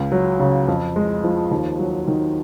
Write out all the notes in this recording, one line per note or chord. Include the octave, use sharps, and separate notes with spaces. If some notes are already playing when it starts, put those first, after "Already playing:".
Already playing: C#2
F#3
C#3
F2
G#3
F3
D#2
F#3
D#3